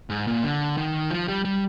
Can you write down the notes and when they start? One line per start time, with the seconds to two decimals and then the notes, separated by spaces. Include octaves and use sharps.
0.10 G#2
0.27 A#2
0.44 D3
0.77 D#3
1.11 F3
1.28 G3
1.45 G3